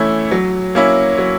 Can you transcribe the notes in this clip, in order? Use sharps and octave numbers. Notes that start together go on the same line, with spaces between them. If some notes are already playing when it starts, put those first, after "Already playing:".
Already playing: E3 A3 C#4 E4
F#3
A#3 C#4 E4
F#3